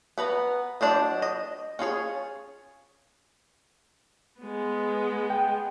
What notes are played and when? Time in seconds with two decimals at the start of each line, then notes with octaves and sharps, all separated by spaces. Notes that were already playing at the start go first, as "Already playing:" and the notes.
0.18 B3 B4 A#5
0.81 F#3 C4 D4 C5 D#5
1.22 D#5
1.79 C#4 F4 G#4 C#5
4.41 G#3 B3
5.30 G5